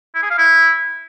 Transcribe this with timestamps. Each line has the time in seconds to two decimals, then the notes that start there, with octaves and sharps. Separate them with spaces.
0.15 E4
0.23 G#4
0.30 F5
0.38 E4